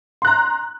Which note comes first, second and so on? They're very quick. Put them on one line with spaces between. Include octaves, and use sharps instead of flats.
C6 F#6 A#5